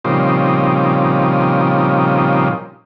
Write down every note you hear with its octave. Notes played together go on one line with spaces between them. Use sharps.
A#2 C#3 F3 G3 C4 D#4